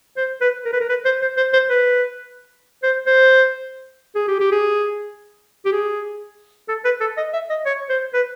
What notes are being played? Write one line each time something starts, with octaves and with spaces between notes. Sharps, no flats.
C5
B4
A#4
B4
A#4
B4
C5
C5
C5
C5
B4
C5
C5
G#4
G4
G4
G#4
G4
G#4
A4
B4
A4
D#5
E5
D#5
C#5
C5
B4